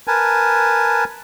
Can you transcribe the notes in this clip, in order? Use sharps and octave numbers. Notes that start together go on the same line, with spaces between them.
A#4 B4 G#5 A5